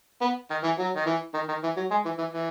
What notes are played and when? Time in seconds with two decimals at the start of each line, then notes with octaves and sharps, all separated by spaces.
0.21 B3
0.50 D#3
0.64 E3
0.78 F#3
0.96 D#3
1.06 E3
1.34 D#3
1.48 D#3
1.63 E3
1.77 F#3
1.91 G#3
2.05 E3
2.18 E3
2.33 E3